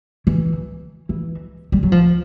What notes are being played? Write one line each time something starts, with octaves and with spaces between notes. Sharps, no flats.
E3
E3
G3
F#3
F3